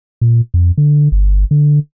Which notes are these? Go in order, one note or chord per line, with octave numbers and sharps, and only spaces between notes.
A#2
F2
D3
G1
D3